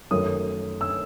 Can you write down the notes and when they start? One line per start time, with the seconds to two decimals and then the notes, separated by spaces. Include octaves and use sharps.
0.11 F#2 D#3 F#3 A3 D#6
0.81 E6